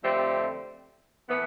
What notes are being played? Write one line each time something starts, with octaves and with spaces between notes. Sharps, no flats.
F2 D3 A3 C4 G4
A2 E3 B3